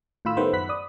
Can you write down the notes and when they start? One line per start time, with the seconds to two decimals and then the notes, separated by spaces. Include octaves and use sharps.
0.25 A2 D#3 F4 B5 E6
0.37 D#3 G3 A3 B3 B4 C5
0.53 F#2 F#5 B5 F#6 B6
0.69 D5 D#6